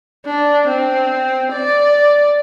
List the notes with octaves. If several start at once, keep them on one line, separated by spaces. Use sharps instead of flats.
D4
C4
D5